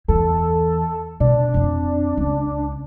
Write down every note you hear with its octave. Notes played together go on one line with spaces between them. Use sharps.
E2 E3 A4
B2 D4
F2 C4
C#2